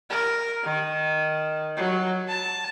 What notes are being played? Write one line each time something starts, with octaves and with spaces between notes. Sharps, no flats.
A#4
D#3
F#3
A5